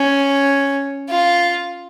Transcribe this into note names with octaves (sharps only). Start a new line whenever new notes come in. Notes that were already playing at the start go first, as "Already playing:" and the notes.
Already playing: C#4
F4